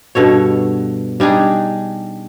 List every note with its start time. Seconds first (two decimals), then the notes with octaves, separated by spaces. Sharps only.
0.15 G2 B2 A4 C#5
1.20 G3 D4 D#4 G#4